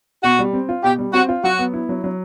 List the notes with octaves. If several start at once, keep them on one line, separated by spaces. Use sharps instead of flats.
B2 F#4
G3
C4
F4
B2 G4
G3
C4 F#4
F4
F#3 F#4
B3
E4
F#3
F#3